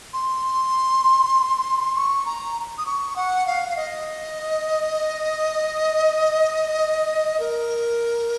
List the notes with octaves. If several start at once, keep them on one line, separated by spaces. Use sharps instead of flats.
C6
C#6
A#5
D#6
C#6
F#5
F5
F5
D#5
A#4